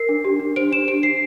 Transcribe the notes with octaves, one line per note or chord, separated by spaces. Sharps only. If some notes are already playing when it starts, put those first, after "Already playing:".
Already playing: A#4 C7
D4
G4
D4
C5 D7
D4 E7
G4 D7
D4 C7